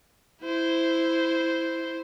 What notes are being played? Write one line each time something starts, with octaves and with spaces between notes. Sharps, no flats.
E4 C5